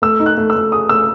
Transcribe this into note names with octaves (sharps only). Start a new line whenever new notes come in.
A3 E6
D#4
F#6
A3
E6
A3
G#4 D#6
A3 E6